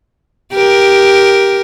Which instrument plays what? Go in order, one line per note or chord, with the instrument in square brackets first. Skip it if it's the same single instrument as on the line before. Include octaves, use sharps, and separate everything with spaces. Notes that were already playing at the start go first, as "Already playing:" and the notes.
[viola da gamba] G4 A#4